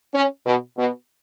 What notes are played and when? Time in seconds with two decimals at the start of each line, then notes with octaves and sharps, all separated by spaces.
0.15 C#4
0.46 B2
0.78 B2